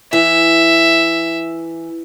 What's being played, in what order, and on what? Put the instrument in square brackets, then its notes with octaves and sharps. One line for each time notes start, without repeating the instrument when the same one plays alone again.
[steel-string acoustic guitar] E3 [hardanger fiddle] E5